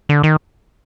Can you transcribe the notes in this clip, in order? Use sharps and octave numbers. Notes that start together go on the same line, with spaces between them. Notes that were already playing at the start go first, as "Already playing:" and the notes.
D3
D#3